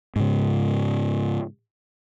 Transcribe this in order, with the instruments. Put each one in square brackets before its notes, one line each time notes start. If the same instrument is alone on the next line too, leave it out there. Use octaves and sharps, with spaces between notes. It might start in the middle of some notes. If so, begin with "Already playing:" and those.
[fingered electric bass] G#2 C#3